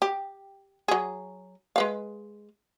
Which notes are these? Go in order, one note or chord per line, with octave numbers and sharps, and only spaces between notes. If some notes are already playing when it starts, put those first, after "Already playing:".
G4
F#3 G#4
G#3 B4 F5